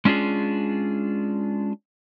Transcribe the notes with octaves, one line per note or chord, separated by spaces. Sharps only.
G#3 C#4 D4 F4 G#4